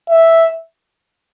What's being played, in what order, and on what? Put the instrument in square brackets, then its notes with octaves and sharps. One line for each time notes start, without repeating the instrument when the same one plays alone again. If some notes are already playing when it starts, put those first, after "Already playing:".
[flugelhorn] E5